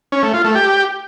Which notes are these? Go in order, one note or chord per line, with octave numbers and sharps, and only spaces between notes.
C#4
A3
F4
A3
G4